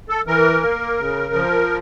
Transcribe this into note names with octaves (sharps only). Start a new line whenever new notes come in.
A4
E3 A#4
A#3
C#3
F3